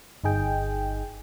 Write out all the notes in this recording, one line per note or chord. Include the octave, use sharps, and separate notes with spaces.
G1 D#4 G#4 G5